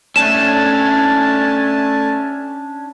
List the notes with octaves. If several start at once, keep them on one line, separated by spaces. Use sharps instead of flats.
A3 C#4 D4 G#5 A5 E7